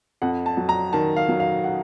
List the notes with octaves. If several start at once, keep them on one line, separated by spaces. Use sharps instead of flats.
F2 F#5
A5
F#3
A#5
D#3 A5
F5
F#3
F5
F#5